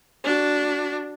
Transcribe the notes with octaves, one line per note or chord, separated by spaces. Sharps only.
D4 F#4